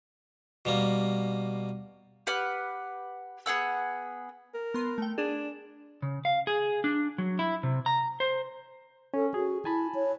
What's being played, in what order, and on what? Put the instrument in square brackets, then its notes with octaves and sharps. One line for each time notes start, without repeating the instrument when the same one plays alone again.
[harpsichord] B2 G3 A#3
[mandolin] G4 B4 F#5 F6
B3 G#4 F#5 E6
[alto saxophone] A#4
[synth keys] B3 C6
A3 G5
[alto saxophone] D4 [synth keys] G#4
[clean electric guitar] C#3
F5
G#4
D4
F#3
E4
C3
A#5
C5
[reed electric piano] C#4 [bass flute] A4
[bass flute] F#4 [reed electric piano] G#4
[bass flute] E4 [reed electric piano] G#5 A5 B5
[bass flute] C#5